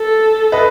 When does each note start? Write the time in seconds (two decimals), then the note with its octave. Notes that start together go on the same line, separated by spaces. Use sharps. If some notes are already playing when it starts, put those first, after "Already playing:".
Already playing: A4
0.52 B4 D#5